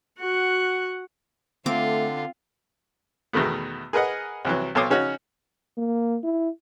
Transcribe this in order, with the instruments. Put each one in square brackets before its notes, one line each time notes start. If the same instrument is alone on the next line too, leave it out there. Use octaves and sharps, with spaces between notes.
[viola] F#4 F#5
[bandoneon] D3 [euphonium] A3 [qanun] C4 D6 [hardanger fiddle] F4
[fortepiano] E2 B2 D#3 A3 B3
G#4 A#4 B4 D#5 F#5
C2 E3 F#3
B1 A4 C#5 C6 D6 D#6
C#3 C#4 D#4 F#4
[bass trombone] A#3
E4